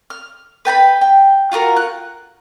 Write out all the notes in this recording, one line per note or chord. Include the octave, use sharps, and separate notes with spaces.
F6
B4 G5 A5 B5
G5
F4 F#4 G#4 A#4
F#6